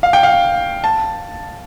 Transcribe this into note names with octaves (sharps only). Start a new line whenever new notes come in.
F5
G5
F5
A5